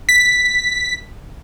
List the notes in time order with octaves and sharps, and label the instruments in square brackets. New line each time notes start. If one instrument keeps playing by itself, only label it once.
[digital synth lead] B6